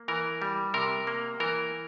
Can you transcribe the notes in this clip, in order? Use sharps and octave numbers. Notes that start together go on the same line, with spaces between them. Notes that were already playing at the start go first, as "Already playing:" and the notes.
Already playing: A#3
E3 A#4
G3
C3 A#4
A#3
E3 A#4